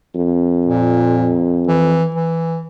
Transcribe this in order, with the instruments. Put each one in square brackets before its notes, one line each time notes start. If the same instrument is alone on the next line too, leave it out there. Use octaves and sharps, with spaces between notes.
[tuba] F2
[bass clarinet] A#2
E3
E3